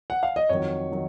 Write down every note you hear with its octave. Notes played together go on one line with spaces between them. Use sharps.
F#5
F5
D#5
F2 D#3 F#3 C#5
D#3 F#3